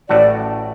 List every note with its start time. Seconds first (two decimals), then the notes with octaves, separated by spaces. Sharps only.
0.09 A1 A2 A3 F#4 D5